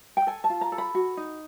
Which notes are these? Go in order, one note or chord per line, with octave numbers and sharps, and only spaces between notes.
G5
A4 G#5
A5
F4
A#5
A4
B5
F#4
D#4